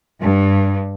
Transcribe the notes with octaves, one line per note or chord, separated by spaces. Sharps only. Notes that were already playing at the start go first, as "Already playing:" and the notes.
G2